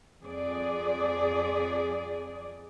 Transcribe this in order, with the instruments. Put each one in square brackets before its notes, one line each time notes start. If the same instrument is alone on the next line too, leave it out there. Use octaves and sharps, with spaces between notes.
[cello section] F2 G#4 D5